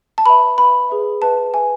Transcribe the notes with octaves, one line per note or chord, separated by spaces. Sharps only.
A5
B4 E5 B5
B4 E5 B5
G#4 B4 E5
G#4 B4 E5 A5
B4 E5 G#5